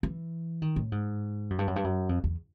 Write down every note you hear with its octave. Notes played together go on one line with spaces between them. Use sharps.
E3
D#3
A2
G#2
F#2
G2
F#2
G2
F#2
F2
E2